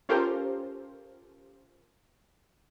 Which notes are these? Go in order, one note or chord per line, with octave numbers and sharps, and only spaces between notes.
C#4 F4 G4 A4 A#4 C5